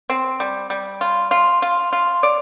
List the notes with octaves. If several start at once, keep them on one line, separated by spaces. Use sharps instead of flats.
C4
G3
G3
F4
F4
F4
F4
D5